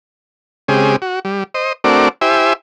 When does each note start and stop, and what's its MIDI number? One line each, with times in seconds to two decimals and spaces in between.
0.68 0.96 49
0.68 0.96 56
0.68 0.96 60
0.68 0.96 67
0.68 0.96 68
1.02 1.19 66
1.25 1.44 55
1.54 1.73 72
1.54 1.73 75
1.84 2.09 57
1.84 2.09 60
1.84 2.09 62
1.84 2.09 66
1.84 2.09 70
1.84 2.09 74
2.21 2.53 64
2.21 2.53 67
2.21 2.53 72
2.21 2.53 76
2.21 2.53 80